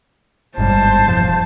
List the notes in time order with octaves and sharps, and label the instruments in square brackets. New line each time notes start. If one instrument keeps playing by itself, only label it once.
[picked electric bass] G1 G#2 G3 [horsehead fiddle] C5 A5
[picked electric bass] E1 G#2 F3